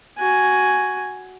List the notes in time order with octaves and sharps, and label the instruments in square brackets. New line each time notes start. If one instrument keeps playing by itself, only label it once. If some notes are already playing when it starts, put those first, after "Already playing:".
[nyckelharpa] F#4 G#5